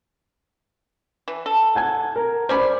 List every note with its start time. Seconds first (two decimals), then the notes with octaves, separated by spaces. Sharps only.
1.28 E3
1.46 A4
1.75 F#5 G#5 G#6
2.16 A#4
2.49 G3 C#4 C5 D5 B5